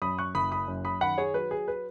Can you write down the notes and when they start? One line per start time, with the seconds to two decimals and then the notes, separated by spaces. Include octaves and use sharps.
0.02 F#2 B5 D#6
0.18 C#6 F#6
0.34 F#1 B5 D#6
0.52 B5 D#6
0.68 F#2
0.85 B5 D#6
1.01 D#3 F#5 B5
1.18 G#4 C#5
1.34 F#3 B4
1.51 G#4
1.68 B4